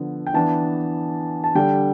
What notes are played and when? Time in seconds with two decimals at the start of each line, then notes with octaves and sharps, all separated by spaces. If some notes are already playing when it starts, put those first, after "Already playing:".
Already playing: D3 F3 B3
0.27 G5
0.34 E3 B3 D4 A5
1.44 A5
1.55 D3 G3 D4 G5